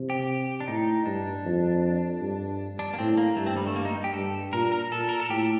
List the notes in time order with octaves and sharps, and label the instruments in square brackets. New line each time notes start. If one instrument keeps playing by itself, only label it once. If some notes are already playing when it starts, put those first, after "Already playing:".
Already playing: [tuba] C3
[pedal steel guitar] G4
D4
[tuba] A2 [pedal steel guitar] D#4
[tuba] G2 [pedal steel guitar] D4
[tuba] F2
G2
[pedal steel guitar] D4
A#3
[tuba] A2 [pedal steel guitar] C4
[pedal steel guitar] A#3
[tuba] G2 [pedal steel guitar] A3
[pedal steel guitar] C4
G3
A3
A#3
D#4
G4
[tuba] G2 [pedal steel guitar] A4
[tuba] A#2 [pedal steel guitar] A#4
[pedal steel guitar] A#4
[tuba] A#2 [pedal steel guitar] A4
[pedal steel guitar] A#4
A4
[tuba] A2 [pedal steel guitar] G4